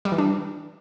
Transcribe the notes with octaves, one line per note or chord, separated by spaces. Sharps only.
G3
E3
D4